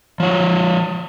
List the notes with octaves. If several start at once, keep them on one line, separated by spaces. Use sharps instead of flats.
F3 C#5